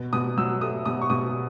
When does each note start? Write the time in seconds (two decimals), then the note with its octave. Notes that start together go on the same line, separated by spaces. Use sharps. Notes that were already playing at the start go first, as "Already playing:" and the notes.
Already playing: B2
0.13 B2 D#6
0.37 F#3 E6
0.61 A3 D#6
0.86 B2 D#6
1.02 C#6
1.10 B2 D#6